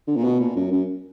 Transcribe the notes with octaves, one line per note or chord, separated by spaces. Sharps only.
D3
A#2
B2
A#2
F#2
F#2